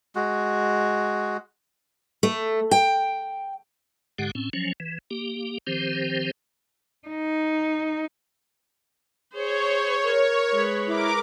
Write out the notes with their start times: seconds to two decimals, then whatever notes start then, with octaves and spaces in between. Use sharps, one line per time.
0.15 G#3 F#4
2.23 A3
2.71 G5
4.18 G#2 D3 G#3 G4 F#5
4.35 A2 C4 C#4
4.53 F3 F#3 C#4
4.80 E3
5.11 A#3 G4
5.67 D#3 F3 C4 G4 C5
7.08 D#4
9.33 G#4 C5 C#5
10.04 A#4
10.53 G#3 B4
10.87 E4 A#4 D6